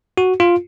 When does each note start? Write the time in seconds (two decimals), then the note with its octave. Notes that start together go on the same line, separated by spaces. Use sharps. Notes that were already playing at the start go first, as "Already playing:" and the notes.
0.18 F#4
0.40 F4